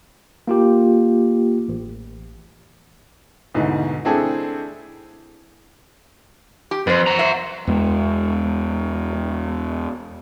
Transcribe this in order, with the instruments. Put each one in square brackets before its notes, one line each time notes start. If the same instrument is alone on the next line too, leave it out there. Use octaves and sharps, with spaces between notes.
[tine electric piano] A#3 F4 G4
A1
[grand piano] D2 G#2 B2 E3
A3 C4 D4 E4 G#4 A4
[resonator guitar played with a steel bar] G4
[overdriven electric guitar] F2 [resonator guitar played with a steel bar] B4 C5
[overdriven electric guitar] F#5 A#5
[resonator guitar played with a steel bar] C5 E5
[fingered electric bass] E2 G#3